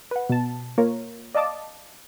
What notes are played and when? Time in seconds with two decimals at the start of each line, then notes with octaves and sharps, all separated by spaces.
0.11 B4 F#5
0.29 B2 A5
0.78 A#3 F4 A#4 C#5
1.35 D5 D#5 F5 A5 D6 D#6